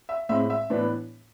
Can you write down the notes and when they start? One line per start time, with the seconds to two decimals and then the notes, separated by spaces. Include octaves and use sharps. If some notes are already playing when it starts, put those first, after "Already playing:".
0.09 E5
0.29 A2 G#3 C4 E5
0.50 E5
0.70 A2 E3 B3 D4